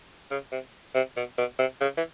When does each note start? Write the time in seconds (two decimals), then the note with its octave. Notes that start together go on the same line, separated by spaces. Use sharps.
0.31 C#3
0.52 C3
0.95 C3
1.17 B2
1.38 B2
1.59 C3
1.81 C#3
1.97 E3